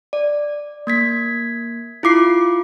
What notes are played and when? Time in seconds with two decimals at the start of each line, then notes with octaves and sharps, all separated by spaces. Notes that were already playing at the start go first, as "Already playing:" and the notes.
0.13 D5
0.87 A#3 G#6 B6
2.03 E4 F4 D6 C7